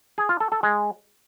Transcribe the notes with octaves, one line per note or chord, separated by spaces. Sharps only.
G#4
F4
A4
A4
G#3